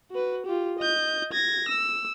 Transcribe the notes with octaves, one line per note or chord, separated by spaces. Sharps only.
F#4 B4
F4 G4
D#5 G6
G#6 A#6
E6